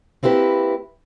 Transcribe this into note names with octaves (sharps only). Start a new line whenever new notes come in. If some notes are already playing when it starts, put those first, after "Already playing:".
A#3 C4 E4 G4 B4